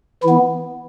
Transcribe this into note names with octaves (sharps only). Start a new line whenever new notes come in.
E3 E4
B3